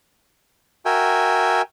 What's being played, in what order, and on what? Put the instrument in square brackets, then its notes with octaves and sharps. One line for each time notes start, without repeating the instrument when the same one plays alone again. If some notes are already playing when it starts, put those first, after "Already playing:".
[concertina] F#4 A#4 E5 G5 G#5